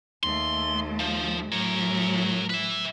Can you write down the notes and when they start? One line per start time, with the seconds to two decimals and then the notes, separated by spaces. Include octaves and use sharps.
0.23 D#2 A3 C6
1.00 F3
1.52 A2 F#3 A#4 C#5
2.50 B4 E5